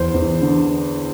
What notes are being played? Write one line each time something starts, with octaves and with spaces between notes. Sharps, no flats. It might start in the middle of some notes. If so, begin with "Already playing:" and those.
Already playing: E2 C5
E2
D3